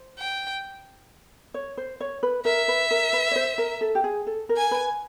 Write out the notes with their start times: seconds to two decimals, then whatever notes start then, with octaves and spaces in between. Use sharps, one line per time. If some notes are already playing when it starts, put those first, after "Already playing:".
Already playing: C5
0.18 G5
1.54 C#5
1.77 C5
2.00 C#5
2.23 B4
2.45 A#4 E5
2.68 B4
2.91 A#4
3.13 B4
3.31 C#5
3.36 C5
3.58 A#4
3.81 A4
3.95 G4
4.04 G#4
4.27 A4
4.49 A#4
4.57 G#5
4.71 B4